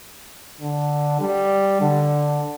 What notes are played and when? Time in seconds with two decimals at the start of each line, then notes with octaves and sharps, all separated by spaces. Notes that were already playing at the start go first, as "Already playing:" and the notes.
0.61 D3
1.21 G3
1.81 D3